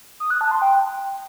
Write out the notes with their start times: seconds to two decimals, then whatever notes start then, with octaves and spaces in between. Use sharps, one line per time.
0.20 D#6
0.30 F#6
0.41 A5
0.51 C6
0.62 G5